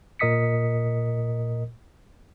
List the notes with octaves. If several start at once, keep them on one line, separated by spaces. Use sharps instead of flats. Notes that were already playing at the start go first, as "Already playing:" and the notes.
A#2 A#4 D#5 D#6 B6 C#7